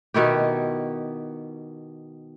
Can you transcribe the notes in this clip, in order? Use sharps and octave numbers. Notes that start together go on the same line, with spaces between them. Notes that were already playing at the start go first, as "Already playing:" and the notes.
B2 D#3 E4 G4